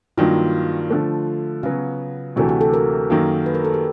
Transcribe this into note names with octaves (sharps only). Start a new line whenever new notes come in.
G2 D#3 F#3 A#3 F4
D3 F3 A3
C#3 F#3 B3 F#4
D2 C3 E3 A3 F#4
G4
A4
A#4
F#2 D#3 F#3 A#3
B4
A#4
A4
G4